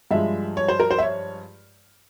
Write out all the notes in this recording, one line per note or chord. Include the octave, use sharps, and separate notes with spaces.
G2 F3 G#3 E5
C#5
C5
A#4
C5
E5
C#5